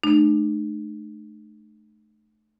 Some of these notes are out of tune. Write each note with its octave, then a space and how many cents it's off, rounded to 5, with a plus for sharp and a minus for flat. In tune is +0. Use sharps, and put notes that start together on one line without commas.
A3 -30 D#4 -45